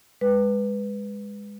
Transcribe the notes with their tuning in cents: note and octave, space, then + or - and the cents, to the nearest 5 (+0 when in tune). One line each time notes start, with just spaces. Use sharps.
G#3 -20 B4 +0